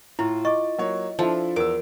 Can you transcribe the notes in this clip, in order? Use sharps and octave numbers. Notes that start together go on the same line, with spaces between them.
A2 E4 F4
D#5 C#6 D6 A6
F#3 A#3 C#5
F3 D4 E4 A4
E2 A#4 D6 E6